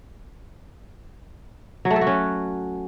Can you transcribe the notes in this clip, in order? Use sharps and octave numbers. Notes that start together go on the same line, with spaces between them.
F#3
A3
A4
F#4
C#4